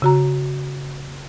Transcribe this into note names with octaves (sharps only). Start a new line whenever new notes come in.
C#3 F#4 A#5